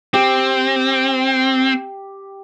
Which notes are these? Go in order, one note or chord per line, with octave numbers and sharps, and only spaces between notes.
C4 G4